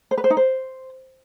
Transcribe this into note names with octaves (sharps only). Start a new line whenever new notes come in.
C5
B4
C5
D#4
C5